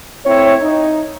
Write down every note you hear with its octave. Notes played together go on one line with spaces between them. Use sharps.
A2 C4 E4 C#5
D#4